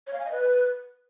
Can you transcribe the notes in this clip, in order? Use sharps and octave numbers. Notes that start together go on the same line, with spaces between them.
C#5
F5
G#5
D#5
B4